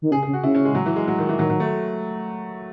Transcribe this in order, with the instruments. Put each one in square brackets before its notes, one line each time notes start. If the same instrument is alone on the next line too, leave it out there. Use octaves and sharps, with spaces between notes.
[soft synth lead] D#3
[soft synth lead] C#3 [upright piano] G#4
[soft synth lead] C#3 [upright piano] G#4
[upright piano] F#4
[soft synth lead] C#3 [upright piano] E4
[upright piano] C#4
G#3
F#3
E3
G#3
F#3
D#3
E3
[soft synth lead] D#3 [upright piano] F#3
[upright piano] F#3
A3